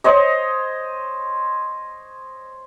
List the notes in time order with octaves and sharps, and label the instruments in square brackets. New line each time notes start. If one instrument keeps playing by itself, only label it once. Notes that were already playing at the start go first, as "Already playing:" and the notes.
[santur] C5 C#5 D#5